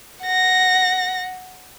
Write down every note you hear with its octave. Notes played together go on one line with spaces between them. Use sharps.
F#5 A#6